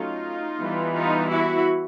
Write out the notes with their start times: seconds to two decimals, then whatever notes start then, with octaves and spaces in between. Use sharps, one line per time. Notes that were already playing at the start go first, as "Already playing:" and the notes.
Already playing: F#3 A3 C#4 D#4 F4
0.59 E3 G3 B3
0.94 D#4 F4
1.29 E4 F#4